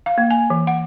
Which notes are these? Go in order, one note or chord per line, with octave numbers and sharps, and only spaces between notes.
F5
A#3
G#5
E3
F#5